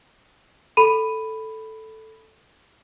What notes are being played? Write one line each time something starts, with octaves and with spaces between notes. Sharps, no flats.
A4 B5 D#7